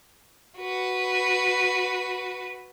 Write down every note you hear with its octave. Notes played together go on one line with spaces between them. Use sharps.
F#4 B4